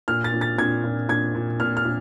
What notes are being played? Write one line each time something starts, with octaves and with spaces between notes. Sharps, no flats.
A#2 F6
A6
A#2
A6
A#2 G#6
A#2
A#2 G#6
A#2
A#2 F6
F6
A#2